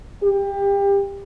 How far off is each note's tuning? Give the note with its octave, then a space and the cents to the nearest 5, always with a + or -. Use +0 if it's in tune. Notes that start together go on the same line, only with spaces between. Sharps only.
G4 +25